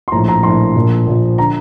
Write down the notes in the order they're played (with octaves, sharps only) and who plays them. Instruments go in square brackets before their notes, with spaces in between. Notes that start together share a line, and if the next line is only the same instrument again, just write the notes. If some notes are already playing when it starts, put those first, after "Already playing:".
[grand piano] C6
A#1 A2 F3 A#5
A#5
A#1 A2 F3 C6
A#1 A#2 F3
A#1 A#2 F3
D3 A#5